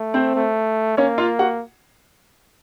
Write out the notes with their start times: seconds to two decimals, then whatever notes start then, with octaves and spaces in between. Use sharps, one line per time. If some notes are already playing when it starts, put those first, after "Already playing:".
Already playing: A3
0.14 C4 C5
0.35 A3
0.97 A#3 C#4 C#5
1.18 F4 F5
1.39 F#4 F#5